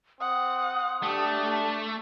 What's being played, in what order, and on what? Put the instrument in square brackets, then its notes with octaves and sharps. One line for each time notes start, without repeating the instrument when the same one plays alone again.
[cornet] C4 [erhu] F#5 [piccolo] D#6
[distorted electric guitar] A3 [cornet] D4 [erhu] G4